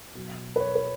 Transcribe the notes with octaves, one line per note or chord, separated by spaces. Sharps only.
B2 F#3
B4
C#5
B4